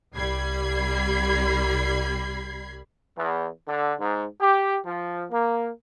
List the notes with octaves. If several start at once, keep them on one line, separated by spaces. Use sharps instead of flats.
C2 G3 B5 G#6 C7
E2
D3
G#2
G4
F3
A#3